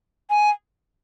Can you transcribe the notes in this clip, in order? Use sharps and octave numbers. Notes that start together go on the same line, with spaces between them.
G#5